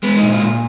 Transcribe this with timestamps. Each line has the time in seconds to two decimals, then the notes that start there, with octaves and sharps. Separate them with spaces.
0.03 G#3 B3
0.17 D#4
0.22 A#2
0.32 F4
0.43 A#2